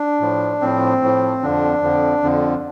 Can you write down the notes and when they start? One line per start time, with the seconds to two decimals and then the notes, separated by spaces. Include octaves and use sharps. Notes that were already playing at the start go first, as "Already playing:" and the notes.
Already playing: D4
0.21 A2 F3
0.61 A2 F3 C4
1.02 A2 F3
1.42 F2 D3 F3 D4
1.82 F2 D3 F3
2.23 F2 D3 F3